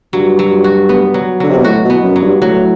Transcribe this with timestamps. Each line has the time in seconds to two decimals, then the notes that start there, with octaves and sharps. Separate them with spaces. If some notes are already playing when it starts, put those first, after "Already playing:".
0.13 G2 F#3
0.39 F#3
0.64 F#4
0.89 B3
1.14 F#3
1.40 D3 F#3
1.51 C3
1.57 B2
1.64 A2 F#4
1.85 B2
1.90 B3
2.03 F#2
2.16 F#3
2.22 G2
2.41 A2 F#3